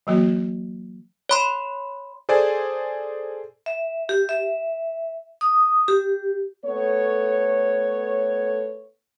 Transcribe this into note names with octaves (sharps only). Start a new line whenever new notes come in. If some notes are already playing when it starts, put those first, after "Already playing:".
E3 F#3 A#3 F#4
C#5 B5 C6
G#4 A4 C5 D5 G#5
E5
G4
E5
D#6
G4
A3 B3 A4 C#5